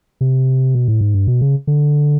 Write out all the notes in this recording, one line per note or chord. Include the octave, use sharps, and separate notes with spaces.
C3
B2
A2
G#2
G2
B2
C#3
D3